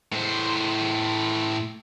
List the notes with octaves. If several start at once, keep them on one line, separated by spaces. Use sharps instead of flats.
A2 C5